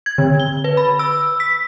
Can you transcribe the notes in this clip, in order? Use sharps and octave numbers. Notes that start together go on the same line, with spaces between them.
G#6
D3
G7
B4
B5
E6
B6